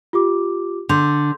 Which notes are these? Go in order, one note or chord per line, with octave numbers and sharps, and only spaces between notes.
F4 G4 D6
D3 C6 G6 F7